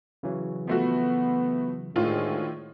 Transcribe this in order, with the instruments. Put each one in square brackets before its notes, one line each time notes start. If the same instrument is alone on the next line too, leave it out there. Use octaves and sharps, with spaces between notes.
[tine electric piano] C#3 E3 F#3
[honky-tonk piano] F3 A3 F#4 [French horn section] B3
[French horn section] D2 G#3 [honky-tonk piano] A2 F4 [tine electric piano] D#3